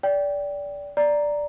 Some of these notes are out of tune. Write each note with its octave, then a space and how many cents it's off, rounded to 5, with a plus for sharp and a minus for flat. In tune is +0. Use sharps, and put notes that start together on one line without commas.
D5 -25 G5 +0
D5 +0 A#5 +0